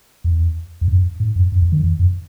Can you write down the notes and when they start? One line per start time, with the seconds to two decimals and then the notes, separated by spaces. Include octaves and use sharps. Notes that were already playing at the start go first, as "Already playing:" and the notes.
0.24 E2
0.81 E2
0.88 F#2
1.20 G#2
1.36 F#2
1.52 F#2
1.62 E2
1.72 D#3
1.83 E2
1.99 F#2